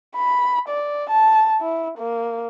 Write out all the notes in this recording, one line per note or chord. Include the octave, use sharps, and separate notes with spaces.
B5
D5
A5
E4
A#3